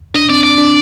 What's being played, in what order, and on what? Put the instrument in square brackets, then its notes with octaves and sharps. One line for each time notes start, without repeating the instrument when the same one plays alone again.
[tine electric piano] D4 [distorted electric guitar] D#5
[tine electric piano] C4 [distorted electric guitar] D5
[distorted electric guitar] D5
[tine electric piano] D4